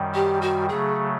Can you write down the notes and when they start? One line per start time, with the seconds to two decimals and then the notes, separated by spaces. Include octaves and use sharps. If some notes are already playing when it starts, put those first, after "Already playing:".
Already playing: F#2 D#3 G3
0.15 G4
0.42 F#4
0.69 C#3 F#3 A3 G#4